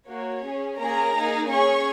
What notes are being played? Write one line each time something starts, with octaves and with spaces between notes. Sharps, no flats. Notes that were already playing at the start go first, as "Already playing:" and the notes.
A#3 F#4 C#5
C#4 G#4
A#3 C#4 G#4 A#4 A#5
A#3 D#4 G#4
C#4 G#4 C#5 C#6